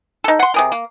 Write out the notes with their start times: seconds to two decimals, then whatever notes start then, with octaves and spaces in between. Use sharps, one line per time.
0.24 D#4 A4
0.39 F#5 C6
0.54 C3 G#4 A#4
0.72 A#3